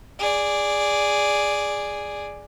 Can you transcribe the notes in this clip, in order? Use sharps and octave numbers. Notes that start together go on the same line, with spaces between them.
G#4 D5